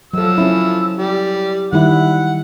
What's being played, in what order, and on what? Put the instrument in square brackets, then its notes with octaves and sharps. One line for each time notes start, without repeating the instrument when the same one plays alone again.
[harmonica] F3 E6 [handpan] F#3 A4
[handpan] C#4 E4
[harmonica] G3
[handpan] D#3 G3 E4 [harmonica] F#5